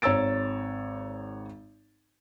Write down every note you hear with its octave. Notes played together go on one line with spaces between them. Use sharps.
G#1 C#5 A#5 E6 A6 D7